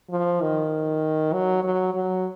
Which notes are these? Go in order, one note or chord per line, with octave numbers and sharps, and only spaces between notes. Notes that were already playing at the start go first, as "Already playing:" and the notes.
F3
D#3
F#3
F#3
F#3